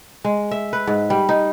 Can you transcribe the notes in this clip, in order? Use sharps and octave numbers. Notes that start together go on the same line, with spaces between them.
G#3
E5
B4
G#2
G3
D#4